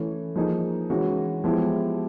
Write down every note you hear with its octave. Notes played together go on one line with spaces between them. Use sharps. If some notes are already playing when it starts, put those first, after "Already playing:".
Already playing: E3 A3 C#4
F3 A#3 D#4 G#4
E3 G#3 C#4 F#4
F3 G#3 B3 E4 G4